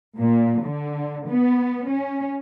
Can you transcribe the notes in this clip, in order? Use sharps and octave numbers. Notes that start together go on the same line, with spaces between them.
A#2
D3
B3
C#4